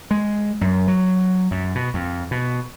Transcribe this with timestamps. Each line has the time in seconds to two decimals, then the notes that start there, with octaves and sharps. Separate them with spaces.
0.11 G#3
0.61 F#2
0.88 F#3
1.51 F#2
1.75 B2
1.94 F2
2.31 B2